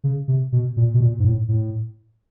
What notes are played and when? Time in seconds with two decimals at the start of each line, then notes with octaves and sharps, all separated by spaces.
0.04 C#3
0.28 C3
0.52 B2
0.77 A#2
0.94 B2
1.01 A#2
1.19 G#2
1.24 A2
1.48 A2